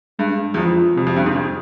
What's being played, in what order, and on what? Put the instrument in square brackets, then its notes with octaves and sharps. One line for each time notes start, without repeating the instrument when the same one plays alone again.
[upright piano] G2 [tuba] G#3
[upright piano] E2
[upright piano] F2 [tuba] F3
[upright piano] F2 [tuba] C3
[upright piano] F2
G2
G#2
F2